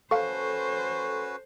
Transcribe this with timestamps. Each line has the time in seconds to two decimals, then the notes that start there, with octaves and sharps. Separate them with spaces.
0.11 C#4 F#4 A4 B4 C5 F5 C#6